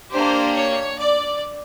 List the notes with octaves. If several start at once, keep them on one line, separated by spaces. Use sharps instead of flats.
A#3 D4 G4 C5
C#5
D5